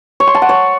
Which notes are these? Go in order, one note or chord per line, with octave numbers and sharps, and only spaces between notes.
C#5
C6
A5
F#5
C#5